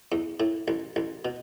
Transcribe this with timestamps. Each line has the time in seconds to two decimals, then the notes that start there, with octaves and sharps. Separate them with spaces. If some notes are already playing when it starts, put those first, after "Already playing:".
0.12 E2
0.40 A2
0.68 A1
0.96 A1
1.25 B2